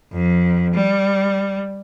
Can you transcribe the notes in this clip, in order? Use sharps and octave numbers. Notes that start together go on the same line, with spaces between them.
F2
G3